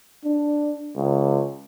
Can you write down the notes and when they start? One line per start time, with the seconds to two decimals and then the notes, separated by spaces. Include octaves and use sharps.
0.25 D4
0.96 C#2